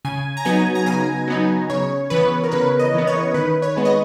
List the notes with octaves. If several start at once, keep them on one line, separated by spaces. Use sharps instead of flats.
C#3 G#5
A#5
F#3 B3 D#4 G#5
A#5
C#3 G#5
F#3 B3 D#4
C#3 C#5
E3 B3 B4
A#4
C#3 B4
D#5
E3 B3
C#5
D#3 B4
C#5
G#3 B3
D#5